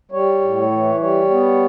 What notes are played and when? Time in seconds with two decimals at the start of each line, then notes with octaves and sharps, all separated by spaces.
0.11 G3 C#5
0.41 A2
0.71 E3
0.99 G3 C#5
1.30 B3